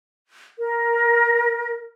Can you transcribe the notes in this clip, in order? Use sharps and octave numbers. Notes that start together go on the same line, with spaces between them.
A#4